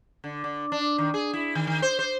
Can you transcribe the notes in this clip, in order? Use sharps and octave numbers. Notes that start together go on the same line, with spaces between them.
D3
D3
D4
D#3
G#4
E4
D#3
D#3
C5
C5